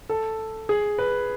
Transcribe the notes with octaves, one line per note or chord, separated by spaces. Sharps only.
A4
G#4
B4